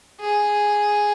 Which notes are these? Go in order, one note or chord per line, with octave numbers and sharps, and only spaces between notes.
G#4